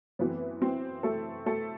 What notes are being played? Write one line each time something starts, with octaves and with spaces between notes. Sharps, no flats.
F#2 E3 A3 B3 C4 B4
C4 C5
A3 A4
A3 A4